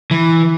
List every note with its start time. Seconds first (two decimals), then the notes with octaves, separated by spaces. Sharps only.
0.11 E3